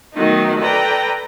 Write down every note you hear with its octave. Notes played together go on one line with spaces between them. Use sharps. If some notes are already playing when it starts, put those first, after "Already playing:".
D#3 F#3 A3 B3 D#4
A4 B4 D5 G5 A#5